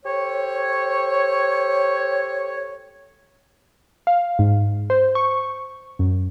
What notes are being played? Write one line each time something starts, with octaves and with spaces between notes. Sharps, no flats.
G4 A4 C5 C#5
F5
G#2
C5
C#6
F#2